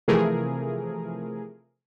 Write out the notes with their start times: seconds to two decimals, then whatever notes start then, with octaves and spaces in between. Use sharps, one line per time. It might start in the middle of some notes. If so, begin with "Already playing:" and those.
0.08 C3 E3 F3 A3 G#4 A#4